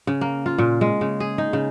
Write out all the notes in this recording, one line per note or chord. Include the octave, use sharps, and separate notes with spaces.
C#3
A#3
F4
A#2
G#3
C#3
G#4
D#4
C#3